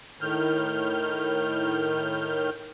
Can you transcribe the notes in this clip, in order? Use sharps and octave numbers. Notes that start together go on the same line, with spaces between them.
A2 D#3 F6 G6